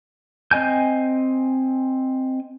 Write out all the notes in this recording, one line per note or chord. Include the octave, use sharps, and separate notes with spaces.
C4 D#5 G#5 G6